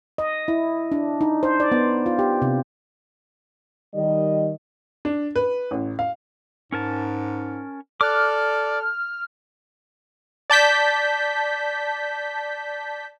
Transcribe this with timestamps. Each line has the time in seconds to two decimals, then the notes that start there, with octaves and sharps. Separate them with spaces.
0.18 D#5
0.48 E4
0.92 D4
1.21 D#4
1.43 C5
1.60 D5
1.72 B3
2.06 F4
2.19 G4
2.42 C3
3.95 D#3 G3 D#5
5.05 D4
5.36 B4
5.71 A1
5.99 F5
6.72 G#2 C#4 A#4 A5
8.01 A4 D5 D6 F6 F#6
10.50 D5 A5 G6 B6